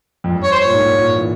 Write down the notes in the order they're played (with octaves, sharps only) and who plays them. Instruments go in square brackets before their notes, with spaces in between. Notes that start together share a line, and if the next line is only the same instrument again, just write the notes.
[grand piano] F2
G2
[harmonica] C#5
C5
C#5
[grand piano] A#2
G#2
A#2
A#2
E3